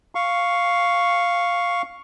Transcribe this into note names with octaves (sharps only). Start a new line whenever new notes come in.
F5 C#6